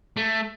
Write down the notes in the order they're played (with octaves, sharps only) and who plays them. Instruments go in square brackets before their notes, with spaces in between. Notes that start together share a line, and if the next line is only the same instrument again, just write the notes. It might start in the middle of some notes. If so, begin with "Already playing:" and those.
[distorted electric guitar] A3